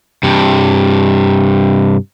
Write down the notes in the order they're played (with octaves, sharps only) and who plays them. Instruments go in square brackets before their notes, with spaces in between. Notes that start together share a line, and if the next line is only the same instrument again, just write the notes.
[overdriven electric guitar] G2 C3